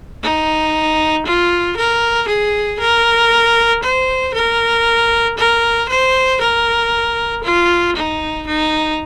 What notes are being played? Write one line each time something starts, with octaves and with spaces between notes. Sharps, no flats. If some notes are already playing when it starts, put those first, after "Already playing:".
D#4
F4
A#4
G#4
A#4
C5
A#4
A#4
C5
A#4
F4
D#4
D#4